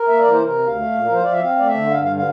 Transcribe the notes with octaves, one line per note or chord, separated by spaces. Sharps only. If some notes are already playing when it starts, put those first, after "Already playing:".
Already playing: A#4
A#3 E5
D5
E3
C5
C3 A#4
D2
F5
A3
A#2
F3 A#4
C5
F3 D5
E5
C4 F5
A3 D5
E5
D3
G2 F5
F5
D3
F5